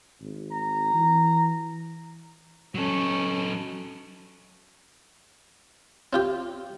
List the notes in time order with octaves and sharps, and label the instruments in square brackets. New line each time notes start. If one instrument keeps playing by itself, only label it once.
[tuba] G#1
[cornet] A#5
[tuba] E3
[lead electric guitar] F#3 A4 [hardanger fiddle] C#4
[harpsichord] C4 F4 G4